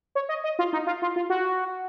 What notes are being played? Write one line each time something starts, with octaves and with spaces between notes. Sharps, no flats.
C#5
D#5
D#5
F4
D#4
F4
F4
F4
F#4